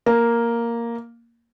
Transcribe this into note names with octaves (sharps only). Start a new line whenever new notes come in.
A#3